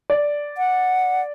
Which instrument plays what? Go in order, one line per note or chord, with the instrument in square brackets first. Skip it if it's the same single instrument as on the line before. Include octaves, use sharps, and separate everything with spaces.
[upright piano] D5
[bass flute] F#5